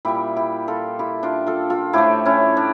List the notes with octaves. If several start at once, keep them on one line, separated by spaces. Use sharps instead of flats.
A#2 G3 E4 G4
E4 G4
F4 A4
E4 G4
D4 F4
F4 A4
F4 A4
A2 F3 A3 E4 G4
C#4 E4
D4